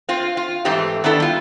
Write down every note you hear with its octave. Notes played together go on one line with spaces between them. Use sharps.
C4 F4
F4
G#2 E3 A3 C4 G4
D#3 B3 D4 E4 A4
G3 F4